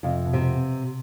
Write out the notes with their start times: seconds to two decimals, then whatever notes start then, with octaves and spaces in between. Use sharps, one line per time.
0.03 F2 C3
0.25 B2
0.33 C3